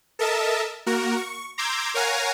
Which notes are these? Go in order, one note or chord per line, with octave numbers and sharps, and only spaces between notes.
A4 A#4 D#5 E5 A5
A#3 F#4 A#4
C#6
A#5 C6 D6 E6 G6 G#6
A#4 C#5 F5 F#5 G#5 A#5